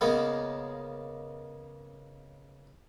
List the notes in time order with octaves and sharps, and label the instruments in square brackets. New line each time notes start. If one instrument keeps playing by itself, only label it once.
[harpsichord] C#3 G#3 A#3 B3